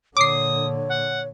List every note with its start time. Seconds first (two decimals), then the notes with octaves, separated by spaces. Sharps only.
0.17 A#2 D3 C#5 D6 D#6 C7
0.89 F#5